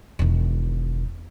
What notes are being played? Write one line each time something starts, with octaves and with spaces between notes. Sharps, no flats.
E1 D#3